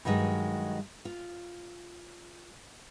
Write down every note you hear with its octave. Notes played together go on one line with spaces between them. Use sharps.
G2 D#3 F#3 G#3 D#5
F4